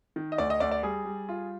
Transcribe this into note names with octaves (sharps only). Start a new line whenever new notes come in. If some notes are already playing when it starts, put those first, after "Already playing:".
D#3
D#5
D2 D5
D#5
D2 D5
D5
G3 G#4
G3
F4